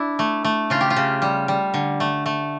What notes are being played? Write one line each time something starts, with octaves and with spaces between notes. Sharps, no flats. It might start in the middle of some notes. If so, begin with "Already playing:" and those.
Already playing: D4 E4
A3
A3
C#3 F4
G4
F4
C#3
G3
G3
D3
A3
A3